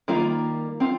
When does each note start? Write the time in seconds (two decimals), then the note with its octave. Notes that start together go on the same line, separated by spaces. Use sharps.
0.08 D#3 G3 A#3 F4
0.80 C4 F4